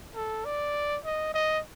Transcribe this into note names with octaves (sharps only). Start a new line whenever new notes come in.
A4
D5
D#5
D#5